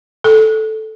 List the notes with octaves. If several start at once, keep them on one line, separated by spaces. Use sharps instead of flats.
A4